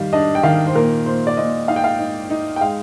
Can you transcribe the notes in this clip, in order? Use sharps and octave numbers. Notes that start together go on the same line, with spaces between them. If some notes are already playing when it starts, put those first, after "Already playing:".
Already playing: D#3 G3 F5
D4 D#5
G5
D#3 F5
C5
A#2 A#4
A#2 C5
D5
A#2 D#5
D#4 F5
G5
F5
D#4
D#4
G5
G#3 F5